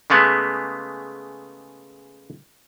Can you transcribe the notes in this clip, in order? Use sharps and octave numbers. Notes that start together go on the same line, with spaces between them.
C#3 G#3 A3 B3